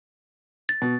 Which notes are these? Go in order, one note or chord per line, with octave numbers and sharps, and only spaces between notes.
A6
B2